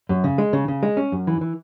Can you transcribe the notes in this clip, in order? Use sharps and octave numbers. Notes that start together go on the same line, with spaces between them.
F#2
C#3
G#3
C#3
C#3
G#3
C#4
F#2
E3
E3